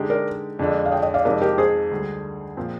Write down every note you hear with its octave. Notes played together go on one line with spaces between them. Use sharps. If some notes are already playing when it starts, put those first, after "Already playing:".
Already playing: D3 G#3 D#4 G4
A#4 D5
F2 D3 G#3 D4
F5
D#5 G5
D#5 G5
D5 F5
F2 C3 D#3 G#3 A#4 D5
G4 A#4
G#4 C5
D2 D3 G3 D4
A#2 F3 C4